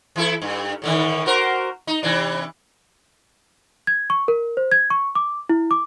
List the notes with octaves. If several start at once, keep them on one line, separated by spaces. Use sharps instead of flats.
E3 E4 A4
G2
A2 D3 D#3
F#4 A#4 C5
D#4
C3 E3 D4
G#6
C#6
A#4
C5
G#6
C#6
D6
E4
D6